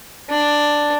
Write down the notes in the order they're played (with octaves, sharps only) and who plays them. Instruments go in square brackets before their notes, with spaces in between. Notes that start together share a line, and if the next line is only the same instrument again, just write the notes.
[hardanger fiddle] D4